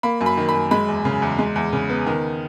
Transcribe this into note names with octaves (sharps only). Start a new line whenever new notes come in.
A#3 B5
F#2
B5
D#3
B5
F#2
G#3 B5
E2
C#3
E2
G#3
E2
C#3
B3
D#3